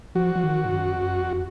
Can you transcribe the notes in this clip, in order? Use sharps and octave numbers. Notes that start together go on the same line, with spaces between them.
F3 F#4
F3
D#3
G#2
F#2
F2
F#2
F2